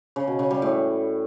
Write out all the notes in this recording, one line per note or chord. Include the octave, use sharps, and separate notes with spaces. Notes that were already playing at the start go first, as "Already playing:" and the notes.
C#3
B2
C#3
G3
A2